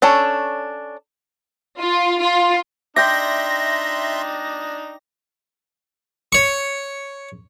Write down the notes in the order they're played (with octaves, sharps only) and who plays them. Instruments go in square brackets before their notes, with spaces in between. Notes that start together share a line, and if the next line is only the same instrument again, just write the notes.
[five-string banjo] C#4 D4 A4 C#5
[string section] F4
F4
[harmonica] D4 D#4 [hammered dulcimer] D5 G5 [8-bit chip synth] E5 C6 [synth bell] A#6
[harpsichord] C#5 C#6